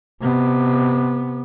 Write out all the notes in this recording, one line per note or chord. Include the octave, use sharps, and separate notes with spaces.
C3 B3